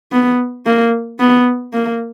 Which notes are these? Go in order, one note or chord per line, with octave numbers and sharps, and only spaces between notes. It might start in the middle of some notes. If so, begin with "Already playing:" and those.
B3
A#3
B3
A#3